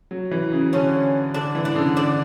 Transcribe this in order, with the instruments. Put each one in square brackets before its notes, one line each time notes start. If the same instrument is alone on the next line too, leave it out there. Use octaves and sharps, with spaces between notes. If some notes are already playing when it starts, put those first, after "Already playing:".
[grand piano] F#3
E3
C#3
[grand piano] D3 [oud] C#4
[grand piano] D3 [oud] D4
[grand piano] E3
[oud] D4
[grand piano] C#3
D3
[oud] D4